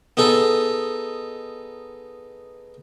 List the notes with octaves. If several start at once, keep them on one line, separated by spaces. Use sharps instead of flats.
B3 D#4 G#4 A4